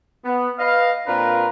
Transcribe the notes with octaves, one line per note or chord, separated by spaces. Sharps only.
B3
B4 D#5 F5
A#2 C4 D4 F4 A#4 B4